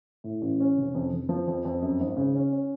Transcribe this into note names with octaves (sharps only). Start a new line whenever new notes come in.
A2
A1
C#4
F1
F2
F2
F3
F2
F2
F#2
G#1
C#3
C#4
C#4